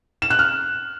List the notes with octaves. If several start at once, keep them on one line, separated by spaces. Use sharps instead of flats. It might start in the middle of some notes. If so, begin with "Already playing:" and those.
E7
F#6
F6